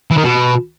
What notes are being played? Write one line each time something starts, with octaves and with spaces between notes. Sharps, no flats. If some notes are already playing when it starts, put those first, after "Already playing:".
E3
D#3
B2